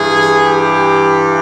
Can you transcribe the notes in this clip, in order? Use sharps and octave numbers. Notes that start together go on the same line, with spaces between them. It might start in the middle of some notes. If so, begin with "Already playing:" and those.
Already playing: G2 E3 G#4
G4